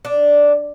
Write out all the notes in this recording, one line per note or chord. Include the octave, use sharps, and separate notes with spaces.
D4